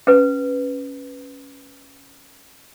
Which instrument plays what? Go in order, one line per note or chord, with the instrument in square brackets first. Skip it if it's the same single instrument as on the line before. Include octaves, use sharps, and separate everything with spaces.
[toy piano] C#4 B4